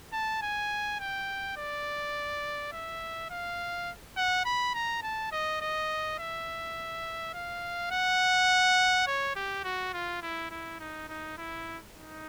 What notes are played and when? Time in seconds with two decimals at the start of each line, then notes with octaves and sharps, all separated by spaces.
0.13 A5
0.42 G#5
0.99 G5
1.57 D5
2.72 E5
3.30 F5
4.17 F#5
4.45 B5
4.74 A#5
5.03 A5
5.32 D#5
5.61 D#5
6.19 E5
7.34 F5
7.91 F#5
9.07 C#5
9.36 G4
9.64 F#4
9.93 F4
10.22 E4
10.51 E4
10.80 D#4
11.09 D#4
11.37 E4
11.95 D#4